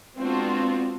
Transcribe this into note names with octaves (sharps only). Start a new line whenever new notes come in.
G#3 B3 C4 D4 F4 F#4